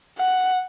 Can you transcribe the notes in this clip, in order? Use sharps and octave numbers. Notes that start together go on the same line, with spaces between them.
F#5